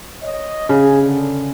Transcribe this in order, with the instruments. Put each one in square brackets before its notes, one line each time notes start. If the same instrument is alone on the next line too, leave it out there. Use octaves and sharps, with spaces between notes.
[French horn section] C#5 D#5
[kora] C#3 [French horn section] G#4
[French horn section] D3